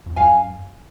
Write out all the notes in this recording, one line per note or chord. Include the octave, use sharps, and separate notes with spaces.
F2
F#2 F5 G#5